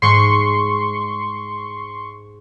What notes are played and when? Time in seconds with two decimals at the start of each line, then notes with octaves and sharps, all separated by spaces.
0.02 G#2 G#3 C6 C#6